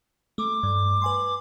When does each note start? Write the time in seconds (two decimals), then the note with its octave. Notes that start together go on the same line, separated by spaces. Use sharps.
0.38 A3 D6
0.63 G2
1.02 B4 G#5 C6